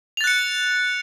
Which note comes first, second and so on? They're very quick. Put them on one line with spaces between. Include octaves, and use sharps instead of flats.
F7 A6 F#6 C#7